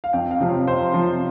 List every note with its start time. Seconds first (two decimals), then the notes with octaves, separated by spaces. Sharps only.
0.04 F5
0.13 F2 G5
0.31 F5
0.40 C3 F3
0.49 C#5
0.67 F2 C5
0.94 C3 F3